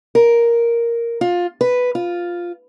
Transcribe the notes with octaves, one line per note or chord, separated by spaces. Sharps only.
A#4
F4
B4
F4